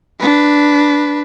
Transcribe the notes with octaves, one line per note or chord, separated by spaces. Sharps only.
D4 B4